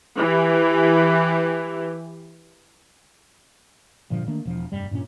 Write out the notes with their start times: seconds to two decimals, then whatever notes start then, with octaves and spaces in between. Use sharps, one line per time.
0.18 E3 G4
4.10 G2 A#2 D3 F3
4.28 D#3 A3 A#3 D4
4.45 E1 F3
4.72 F1 G2 G3
4.91 G2 A#2 C4 C#4